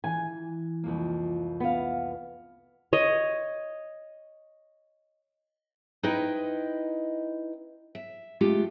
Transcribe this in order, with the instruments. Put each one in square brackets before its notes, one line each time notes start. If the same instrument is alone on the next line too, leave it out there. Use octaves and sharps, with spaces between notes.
[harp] E3 [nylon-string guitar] G#5
[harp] C2 F2 A#3
[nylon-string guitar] B3 F5
[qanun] C#5 D#5
[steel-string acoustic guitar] D#4 E4 B4 C5 D#5 G5
E5
G#3 A3 F4 G4